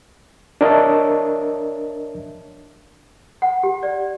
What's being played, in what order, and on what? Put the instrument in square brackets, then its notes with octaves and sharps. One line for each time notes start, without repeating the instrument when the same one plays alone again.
[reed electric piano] D4 A#4 C#5 D#5 E5 A5
[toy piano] F#5
G4
D5